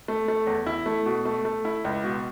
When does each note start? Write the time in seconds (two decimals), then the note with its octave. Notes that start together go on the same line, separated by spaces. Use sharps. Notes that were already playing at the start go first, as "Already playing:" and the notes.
0.08 A3
0.28 A3
0.47 E2
0.66 E4
0.86 A3
1.06 B2
1.25 A3
1.45 A3
1.65 E4
1.84 C#2
2.04 B2